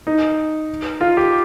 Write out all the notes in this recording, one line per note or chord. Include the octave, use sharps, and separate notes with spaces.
D#4
F4
G4